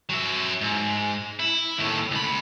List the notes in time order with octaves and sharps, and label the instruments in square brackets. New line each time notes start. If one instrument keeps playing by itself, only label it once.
[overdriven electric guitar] F#3 E5
G#2
E4
D#2 A2
C#2 B5